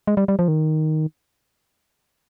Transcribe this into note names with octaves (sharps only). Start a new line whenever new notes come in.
G#3
G3
G3
F3
D#3